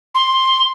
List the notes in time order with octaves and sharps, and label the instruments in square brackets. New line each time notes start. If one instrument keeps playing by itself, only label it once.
[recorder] C6